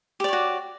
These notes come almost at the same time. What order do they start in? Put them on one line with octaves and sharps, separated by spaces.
G4 D5 C#5 F#4